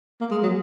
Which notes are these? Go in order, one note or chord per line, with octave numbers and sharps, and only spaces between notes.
A#3
G#3
F#3